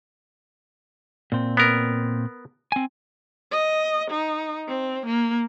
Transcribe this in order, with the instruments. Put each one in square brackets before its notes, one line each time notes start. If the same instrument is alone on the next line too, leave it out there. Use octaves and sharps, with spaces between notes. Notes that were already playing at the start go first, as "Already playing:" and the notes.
[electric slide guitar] A#2 C4
[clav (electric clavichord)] B3 A#4
[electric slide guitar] C4 G#5
[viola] D#5
D#4
C4
A#3